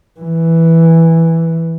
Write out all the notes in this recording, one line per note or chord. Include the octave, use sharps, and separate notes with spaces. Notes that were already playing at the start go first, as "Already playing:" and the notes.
E3